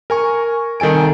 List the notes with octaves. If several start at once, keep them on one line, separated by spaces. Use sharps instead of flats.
A#4 G#5 C#6
C2 D#3 A4 G#5 D7